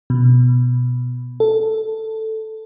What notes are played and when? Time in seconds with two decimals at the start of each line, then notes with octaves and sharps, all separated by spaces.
0.10 B2
1.40 A4